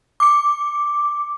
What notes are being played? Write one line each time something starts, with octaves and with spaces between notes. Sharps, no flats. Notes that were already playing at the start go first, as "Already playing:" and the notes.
D6 C#7